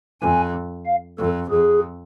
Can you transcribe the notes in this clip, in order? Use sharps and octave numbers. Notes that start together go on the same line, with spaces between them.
F2 G#5
F5
F2 A4
F2 G#4